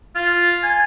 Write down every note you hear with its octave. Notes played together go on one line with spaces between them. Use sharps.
F4
G#5